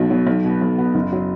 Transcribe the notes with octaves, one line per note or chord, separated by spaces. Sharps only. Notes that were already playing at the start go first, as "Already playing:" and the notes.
Already playing: B1 B2 F#3
B2 F#3
B1
B2 B3
B1
B2 B3
F#1
F#3